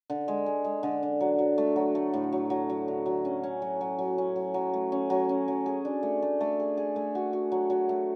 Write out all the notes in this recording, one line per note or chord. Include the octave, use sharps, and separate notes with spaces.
D3
G#3
G#3
G#3
D3
D4
F#3
F#3
A3
F#3
A3
A2
F#3
F#3
F#3
D3
F#3
C#4
C#4
F#3
F#3
F#3
C#4
F#3
F#3
A3
C#4
F#3
C#4
F#3
G#4
D4
A3
A3
A3
G#4
G#4
A3
F#4
F#4
F#3
F#3
A3